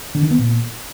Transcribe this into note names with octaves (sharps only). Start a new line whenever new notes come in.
D3
D#3
B3
A#2